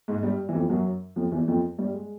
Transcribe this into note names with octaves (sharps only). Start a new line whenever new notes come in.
G#2 G#3
G2 G3
E3
F2 F3
F#2 F#3
F2 F3
E2 E3
F2 F3
G2 G3
G#3